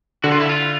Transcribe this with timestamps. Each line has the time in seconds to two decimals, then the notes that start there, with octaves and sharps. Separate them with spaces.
0.24 D3 F#4
0.32 F4
0.40 E4
0.49 F4